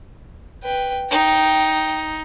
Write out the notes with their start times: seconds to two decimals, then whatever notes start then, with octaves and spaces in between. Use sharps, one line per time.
0.63 B4 G5
1.11 D#4 G5